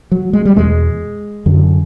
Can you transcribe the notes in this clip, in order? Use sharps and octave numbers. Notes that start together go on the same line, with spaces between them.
F#3
G#3
G3
E2 B2 G#3
F#2 D3